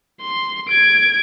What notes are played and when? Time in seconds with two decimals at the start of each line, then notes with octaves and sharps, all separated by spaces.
0.21 C6
0.69 G#6 D7